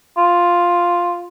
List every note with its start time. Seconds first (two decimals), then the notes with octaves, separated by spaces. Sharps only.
0.17 F4